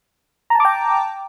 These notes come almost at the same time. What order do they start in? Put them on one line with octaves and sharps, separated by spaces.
A#5 A5 D6 G5